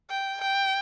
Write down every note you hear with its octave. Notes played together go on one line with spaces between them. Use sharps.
G5
G5